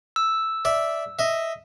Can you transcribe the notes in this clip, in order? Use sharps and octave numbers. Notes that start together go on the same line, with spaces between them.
E6
D5 E5
D#5 E5